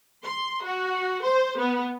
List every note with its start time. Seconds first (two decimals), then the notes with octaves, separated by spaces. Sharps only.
0.24 C6
0.63 F#4
1.23 C5
1.57 B3